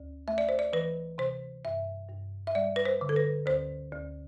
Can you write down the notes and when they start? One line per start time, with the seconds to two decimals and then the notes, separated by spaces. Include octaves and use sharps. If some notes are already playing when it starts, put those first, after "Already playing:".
Already playing: D2
0.28 A3 E5
0.38 D5
0.49 C5
0.59 D5
0.73 E3 B4
1.18 C3 C5
1.65 G2 E5
2.09 G2
2.47 E5
2.55 G3 D5
2.76 B4
2.85 C5
3.01 D3
3.09 A4
3.16 B4
3.46 D2 C5
3.92 D2